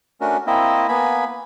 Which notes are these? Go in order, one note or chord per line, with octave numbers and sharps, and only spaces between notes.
A3 C#4 D4 F#4 A#4
A#3 C4 E4 D#5 E5
A#3 B3 G#5 B5